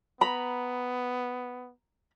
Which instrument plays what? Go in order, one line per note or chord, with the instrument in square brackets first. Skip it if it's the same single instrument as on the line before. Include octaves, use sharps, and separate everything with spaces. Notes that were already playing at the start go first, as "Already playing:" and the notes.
[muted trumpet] B3 [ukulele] A#5 B5